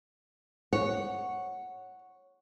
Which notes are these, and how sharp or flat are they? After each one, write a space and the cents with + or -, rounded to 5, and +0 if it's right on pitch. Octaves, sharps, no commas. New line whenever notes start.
C#5 +0 F#5 +0